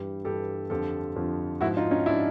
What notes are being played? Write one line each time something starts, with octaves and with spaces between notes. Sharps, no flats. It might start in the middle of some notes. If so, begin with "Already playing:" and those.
Already playing: G2 E3 G3
G2 E3 G3 G4 A4
F2 D3 F3 G4 A4
F2 D3 F3
G#2 F3 E4 F#4
D#4 F4
C#4 D#4
F3 D4 E4